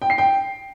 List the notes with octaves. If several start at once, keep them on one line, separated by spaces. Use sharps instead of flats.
G5
C7
G5